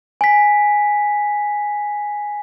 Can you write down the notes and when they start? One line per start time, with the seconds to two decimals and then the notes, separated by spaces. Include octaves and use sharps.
0.21 G#5 B6